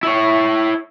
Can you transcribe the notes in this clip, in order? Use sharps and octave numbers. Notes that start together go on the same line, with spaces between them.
E4 C#5